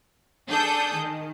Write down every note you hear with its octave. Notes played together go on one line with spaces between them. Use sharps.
D4 G#4 A4 D#6 G6
D#3